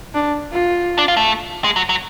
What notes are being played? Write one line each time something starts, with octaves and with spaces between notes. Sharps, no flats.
D4
F4
D4
F4
A3
G#3
F#3
F#3